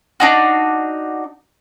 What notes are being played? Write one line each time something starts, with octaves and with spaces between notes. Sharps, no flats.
D4 D#4 F#4